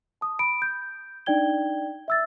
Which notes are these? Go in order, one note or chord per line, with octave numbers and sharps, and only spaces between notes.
A5 D#6
B5 D7
G6
D4 D#4 D5 G5 G#6 G7
E5 E6 A6